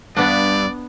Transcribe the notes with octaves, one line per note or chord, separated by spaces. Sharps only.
G2 B3 D4 D5